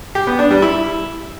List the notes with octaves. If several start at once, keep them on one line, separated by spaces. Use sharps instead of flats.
G4
B3
D4
G3
E4